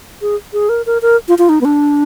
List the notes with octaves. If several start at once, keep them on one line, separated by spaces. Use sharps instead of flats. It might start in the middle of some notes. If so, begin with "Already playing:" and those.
G#4
G#4
A#4
A#4
A#4
F4
F4
D#4
B3
D4